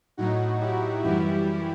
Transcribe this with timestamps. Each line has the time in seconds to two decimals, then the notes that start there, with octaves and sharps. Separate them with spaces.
0.17 A2 F#3 D#4 F#4
0.61 E4 G4
1.03 F#2 E3 G3 E4 G4